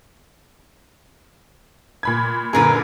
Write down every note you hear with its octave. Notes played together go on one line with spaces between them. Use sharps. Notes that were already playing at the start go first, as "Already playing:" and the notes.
A#2 B5 G#6
F#2 A#2 D3 G#4 A#4 B4